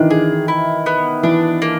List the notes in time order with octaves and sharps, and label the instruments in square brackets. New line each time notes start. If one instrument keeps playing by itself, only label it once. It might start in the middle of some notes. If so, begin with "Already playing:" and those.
Already playing: [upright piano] D#3 E3 [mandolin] D4
[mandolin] G#4
E4
B3
[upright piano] E3 [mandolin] D4
[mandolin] A#3